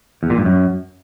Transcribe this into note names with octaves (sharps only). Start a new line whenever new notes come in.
E2
A#2
G2
F#2